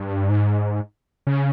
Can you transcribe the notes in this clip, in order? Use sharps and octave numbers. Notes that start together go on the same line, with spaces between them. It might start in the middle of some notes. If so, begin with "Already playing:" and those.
Already playing: G2
G#2
C#3